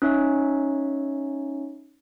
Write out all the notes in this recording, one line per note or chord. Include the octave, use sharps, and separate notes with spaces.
C#4 D#4 C#5 E5